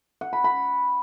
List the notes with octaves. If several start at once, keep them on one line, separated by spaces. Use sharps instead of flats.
F#5
B5
B5